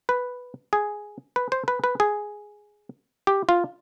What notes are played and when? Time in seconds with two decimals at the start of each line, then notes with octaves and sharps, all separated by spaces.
0.09 B4
0.73 G#4
1.36 B4
1.52 C5
1.68 B4
1.84 B4
2.00 G#4
3.27 G4
3.49 F4